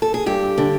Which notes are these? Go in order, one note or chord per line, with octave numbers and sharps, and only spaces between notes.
A4
G#4
G2 G4
D3